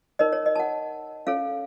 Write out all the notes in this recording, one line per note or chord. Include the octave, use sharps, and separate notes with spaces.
D#4 A#4 C#5 D#5
C#5
D#5
A5
F#5
C#4 A4 C#5 F5